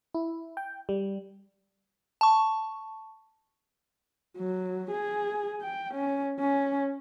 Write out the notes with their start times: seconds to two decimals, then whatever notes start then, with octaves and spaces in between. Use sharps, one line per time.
0.14 E4
0.57 G5
0.89 G3
2.21 A5 C#6
4.38 F#3
4.91 G#4
5.62 G5
5.94 C#4
6.40 C#4